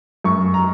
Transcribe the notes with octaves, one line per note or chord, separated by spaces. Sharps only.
F#2 C#6
A#5